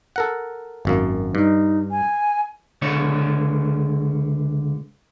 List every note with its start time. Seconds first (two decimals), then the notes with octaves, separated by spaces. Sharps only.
0.16 A4 A#4 F#5
0.85 G#1 F#2 A#3
1.35 G2 D#4
1.91 G#5
2.82 C#2 D3 C#5